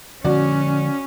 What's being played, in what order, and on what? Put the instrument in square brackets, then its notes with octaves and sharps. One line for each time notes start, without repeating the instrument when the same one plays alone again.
[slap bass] D3 F3 G#3 [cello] C#4 [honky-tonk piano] F#4 D5